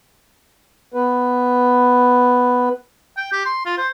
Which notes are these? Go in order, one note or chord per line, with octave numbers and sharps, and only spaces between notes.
B3 B4
G5
G4
C6
F4
C5